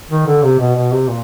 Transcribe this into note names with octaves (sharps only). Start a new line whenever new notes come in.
D#3
D3
C3
B2
B2
C3
A#2